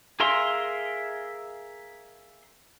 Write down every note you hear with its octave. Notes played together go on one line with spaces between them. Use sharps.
G#4 A#4 E5 F5 C6